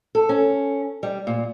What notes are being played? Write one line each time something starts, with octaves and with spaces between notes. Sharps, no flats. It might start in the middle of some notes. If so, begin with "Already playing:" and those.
A4
C#4
G3
A#2